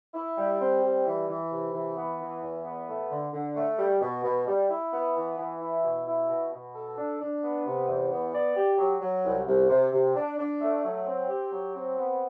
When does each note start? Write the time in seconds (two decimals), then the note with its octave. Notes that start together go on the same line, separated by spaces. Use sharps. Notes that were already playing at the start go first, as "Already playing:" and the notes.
0.14 E4
0.37 G3
0.60 C4
0.82 G3
1.06 E3
1.28 E3
1.51 C3
1.73 E3
1.96 B3
2.19 E3
2.42 E2
2.65 B3
2.88 A3
3.10 D3
3.33 D3
3.56 A3
3.78 G3
4.01 B2
4.23 B2
4.47 G3
4.69 E4
4.92 B3
5.15 E3
5.38 E3
5.60 E4
5.83 B2
6.06 E4
6.29 B2
6.52 B2
6.74 A4
6.97 D4
7.20 D4
7.43 B3
7.65 C3
7.88 E2
8.11 B3
8.34 D5
8.56 G4
8.78 F#3
9.01 F#3
9.24 C2
9.47 C2
9.69 C3
9.92 C3
10.15 D4
10.38 D4
10.61 A3
10.84 F#3
11.06 C4
11.29 G4
11.51 F#3
11.75 C4
11.97 B3